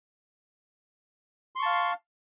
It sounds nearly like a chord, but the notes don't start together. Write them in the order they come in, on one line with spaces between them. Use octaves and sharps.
C6 C#6 A5 F5